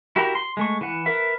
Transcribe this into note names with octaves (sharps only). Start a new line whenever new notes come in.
E4 F#4 G4 A#4 A#5
C6
G#3 A3 C#6
E3 F#5
A#4 B4 E5